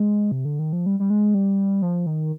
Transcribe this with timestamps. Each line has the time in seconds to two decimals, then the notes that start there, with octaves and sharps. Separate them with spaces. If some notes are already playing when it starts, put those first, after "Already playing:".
Already playing: G#3
0.32 C3
0.45 D3
0.59 D#3
0.73 F3
0.86 G3
1.00 G3
1.10 G#3
1.34 G3
1.82 F3
2.06 D#3